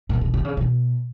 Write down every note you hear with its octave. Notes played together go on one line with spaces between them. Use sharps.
A#2
B2
C3
C#3
B2